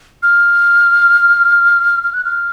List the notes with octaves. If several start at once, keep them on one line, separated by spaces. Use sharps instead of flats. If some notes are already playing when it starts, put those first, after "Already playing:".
F6
F6
F#6
F6